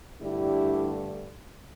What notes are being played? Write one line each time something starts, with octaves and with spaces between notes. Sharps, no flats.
G2 D3 A3 D4 E4 G4